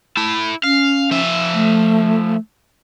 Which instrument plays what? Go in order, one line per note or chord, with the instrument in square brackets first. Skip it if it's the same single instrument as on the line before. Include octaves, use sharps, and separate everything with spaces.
[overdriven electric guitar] E4 A5
[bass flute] C#4 [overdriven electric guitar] F5
[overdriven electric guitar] F3 E5
[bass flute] A3